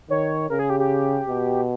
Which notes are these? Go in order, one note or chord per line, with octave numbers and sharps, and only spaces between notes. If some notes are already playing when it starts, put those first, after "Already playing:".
D#3 C#5
C#3 A#4
G#4
G4
G4
B2